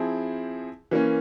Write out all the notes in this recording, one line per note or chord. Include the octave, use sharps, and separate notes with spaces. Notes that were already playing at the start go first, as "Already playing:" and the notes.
Already playing: F3 C4 E4 G#4
E3 A#3 C#4